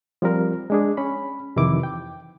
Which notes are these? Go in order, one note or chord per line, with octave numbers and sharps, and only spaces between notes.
F3 G3 C4 A#4
G#3 D4 G#4
C#4 B5
F2 C3 D#3 E3 E4 D6
G5